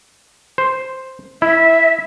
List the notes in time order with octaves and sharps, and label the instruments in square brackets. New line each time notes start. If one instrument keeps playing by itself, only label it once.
[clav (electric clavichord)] C5
[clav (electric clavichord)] E4 [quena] E5